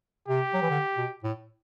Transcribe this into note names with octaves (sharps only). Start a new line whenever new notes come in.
C3 G4
F#3
E3
D3
B2
A2